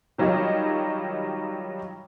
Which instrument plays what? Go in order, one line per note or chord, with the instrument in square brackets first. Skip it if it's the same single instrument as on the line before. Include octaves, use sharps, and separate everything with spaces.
[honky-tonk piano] D#3 F#3 G3 F4 C#5 D#5